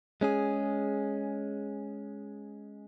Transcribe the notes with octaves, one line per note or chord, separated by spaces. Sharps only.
G#3 C#4 G#4